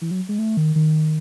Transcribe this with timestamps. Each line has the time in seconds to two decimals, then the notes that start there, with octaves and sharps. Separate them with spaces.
0.01 E3
0.11 F#3
0.29 G#3
0.39 A3
0.57 D#3
0.75 D#3